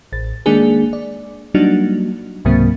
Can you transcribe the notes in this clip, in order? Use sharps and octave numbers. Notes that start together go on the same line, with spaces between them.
A1 A6
D#3 G#3 A#3 D4 D#4 G#4
D5
F#3 G3 A#3 D4 D#4 F#4
C#2 G#2 C3 F#3 A#3 C4